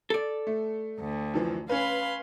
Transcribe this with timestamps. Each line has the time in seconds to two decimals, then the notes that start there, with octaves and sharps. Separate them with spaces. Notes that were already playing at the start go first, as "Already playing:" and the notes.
0.10 A4 D5
0.47 A3
1.00 D2
1.34 F#2 E3 F3
1.69 C#4 B4 F5 B5 C6